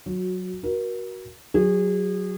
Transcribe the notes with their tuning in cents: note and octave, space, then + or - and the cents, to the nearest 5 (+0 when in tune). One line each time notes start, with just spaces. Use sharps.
F#3 +0 F#4 -20
F#4 +10 A#4 +30
F#3 +0 G#4 -30